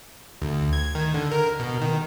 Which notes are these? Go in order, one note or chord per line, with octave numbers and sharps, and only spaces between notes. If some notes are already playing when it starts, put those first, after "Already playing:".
D2
G#6
D#3
D3
A#4
B2
D#3